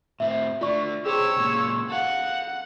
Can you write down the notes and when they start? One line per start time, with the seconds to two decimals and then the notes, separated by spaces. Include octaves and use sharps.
0.20 A2 C4 E5
0.61 D3 A3 F4 D5 C#6
1.06 G4 G#4 C5 C#5 E6
1.37 C#2 A#2
1.90 A4 F5 F#5